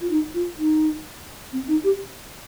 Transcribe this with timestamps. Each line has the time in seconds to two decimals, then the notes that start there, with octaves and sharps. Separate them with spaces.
0.01 F4
0.10 D#4
0.34 F4
0.58 D#4
1.53 C4
1.68 D#4
1.84 G4